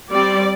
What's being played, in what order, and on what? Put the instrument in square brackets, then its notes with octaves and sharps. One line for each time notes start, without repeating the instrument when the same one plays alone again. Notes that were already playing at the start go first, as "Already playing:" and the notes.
[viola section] G3 C4 D5